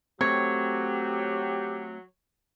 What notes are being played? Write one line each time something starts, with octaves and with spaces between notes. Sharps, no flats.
F#3 A3 C4 G4 C#5